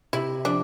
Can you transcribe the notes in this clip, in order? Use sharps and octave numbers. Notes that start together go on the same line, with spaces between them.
C3 E4
F3 D4